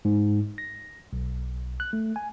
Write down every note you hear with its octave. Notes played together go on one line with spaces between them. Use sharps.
G#2
A#6
B1
F#6
A3
G#5